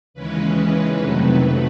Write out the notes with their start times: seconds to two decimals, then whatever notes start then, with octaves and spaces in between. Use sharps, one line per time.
0.14 D#2 C#3 E3 G#3 C#4 B4
0.96 F2 C3 D#3 F#3 A3